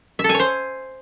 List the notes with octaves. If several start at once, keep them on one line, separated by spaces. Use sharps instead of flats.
E5
A4
G#5
C#5
C5